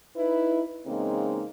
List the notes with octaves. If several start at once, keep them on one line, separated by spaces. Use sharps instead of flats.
D#4 E4 B4
E2 C#3 G#3 A#3 C4 D#4